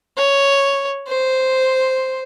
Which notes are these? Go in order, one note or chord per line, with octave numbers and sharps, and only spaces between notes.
C#5
C5